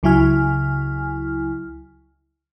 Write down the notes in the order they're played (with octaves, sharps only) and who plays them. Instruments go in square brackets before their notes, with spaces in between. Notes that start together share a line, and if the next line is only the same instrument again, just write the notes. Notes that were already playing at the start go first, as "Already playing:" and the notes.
[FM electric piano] C#2 C#3 F#3 E4 G#5 F6